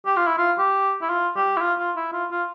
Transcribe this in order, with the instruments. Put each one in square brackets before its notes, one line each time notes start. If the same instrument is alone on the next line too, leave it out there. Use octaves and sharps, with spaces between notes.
[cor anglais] G4
F4
E4
F4
G4
E4
F4
G4
E4
F4
F4
E4
F4
F4